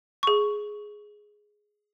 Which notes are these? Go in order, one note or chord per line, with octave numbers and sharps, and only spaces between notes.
G#4 C#6